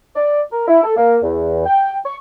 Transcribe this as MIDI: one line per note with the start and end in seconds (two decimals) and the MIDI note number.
0.16 0.41 74
0.52 0.62 70
0.68 0.80 64
0.84 0.95 69
0.97 1.18 58
1.22 1.64 40
1.66 1.96 79
2.06 2.16 85